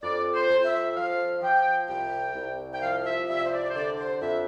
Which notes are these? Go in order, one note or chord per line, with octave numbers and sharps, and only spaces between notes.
F2 D5
C5
F2
E5
F3 F5
F3 G5
C2 G5
C2
G5
F3 F5
E5
C2 E5
C5
D5
C5
D3 D5
C5
F2 E5